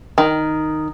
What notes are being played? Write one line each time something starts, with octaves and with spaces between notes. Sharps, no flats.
D#3